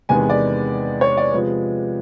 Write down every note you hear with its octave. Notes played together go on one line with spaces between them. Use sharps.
E2 C3 D#3 G#3 B3 G#5
D5
C#5
D5
C3 F3 G#3 B3